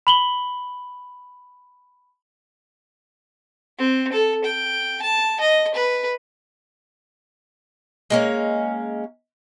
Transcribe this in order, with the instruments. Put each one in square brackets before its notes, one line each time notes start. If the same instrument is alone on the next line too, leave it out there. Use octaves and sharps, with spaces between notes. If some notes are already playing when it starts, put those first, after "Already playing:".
[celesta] B5 F#7 G7
[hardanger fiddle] C4
A4
G5
A5
D#5
B4
[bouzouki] G#3 A#3 C#4